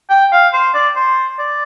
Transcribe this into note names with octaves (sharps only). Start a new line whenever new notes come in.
G5
F5
C5
D5
C5
D5